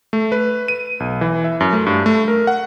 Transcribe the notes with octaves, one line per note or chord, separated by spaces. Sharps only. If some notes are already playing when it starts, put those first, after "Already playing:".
A3
B4
D#7
B1
E3
E5
F#2
A3
G2
A3
A#4
F#5